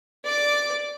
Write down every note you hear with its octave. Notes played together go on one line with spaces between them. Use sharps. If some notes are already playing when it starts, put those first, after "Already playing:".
D5 D6